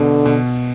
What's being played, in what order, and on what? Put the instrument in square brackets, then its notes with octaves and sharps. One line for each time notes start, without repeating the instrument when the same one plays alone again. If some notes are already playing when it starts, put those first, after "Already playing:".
Already playing: [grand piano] B2 [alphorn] D3
[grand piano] B2